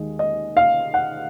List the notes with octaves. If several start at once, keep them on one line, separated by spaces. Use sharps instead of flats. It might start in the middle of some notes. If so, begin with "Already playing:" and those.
Already playing: D#2 D#3 G#3
D#5
F5
F#5